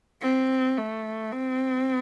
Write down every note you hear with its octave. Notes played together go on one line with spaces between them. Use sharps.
C4
A3
C4